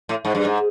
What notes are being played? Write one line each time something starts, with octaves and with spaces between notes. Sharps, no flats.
A2
G#2
G2
G#2